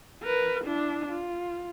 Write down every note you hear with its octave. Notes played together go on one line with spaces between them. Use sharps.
A#4 B4
D4 E4
F4